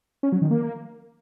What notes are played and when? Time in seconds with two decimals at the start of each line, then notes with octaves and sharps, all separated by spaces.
0.23 C#4
0.32 F#3
0.42 D#3
0.51 A#3